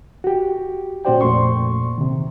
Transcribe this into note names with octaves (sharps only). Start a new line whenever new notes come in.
F#4 G4
A#2 C#4 F#4 C5 D5 G5
F2 A#2 A3 C6 C#6
C3 D#3